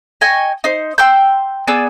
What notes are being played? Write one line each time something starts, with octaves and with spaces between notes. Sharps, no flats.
D#5 G5 G#5 C#6
D#4 C5
G5 C6 E6 G6
B3 G#4 D5 E6